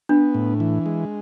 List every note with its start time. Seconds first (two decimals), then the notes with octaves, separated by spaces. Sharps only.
0.09 B3 D4
0.35 A2
0.60 E3
0.86 G#3